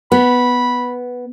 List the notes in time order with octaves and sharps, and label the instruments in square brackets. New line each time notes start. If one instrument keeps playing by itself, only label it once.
[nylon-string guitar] B3 [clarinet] B5